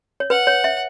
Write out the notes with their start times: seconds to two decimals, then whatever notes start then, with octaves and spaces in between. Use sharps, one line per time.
0.20 C#5
0.30 B4 F#5
0.47 C#5
0.64 E5